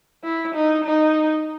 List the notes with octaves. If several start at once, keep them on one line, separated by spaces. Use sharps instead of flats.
E4
D#4
D#4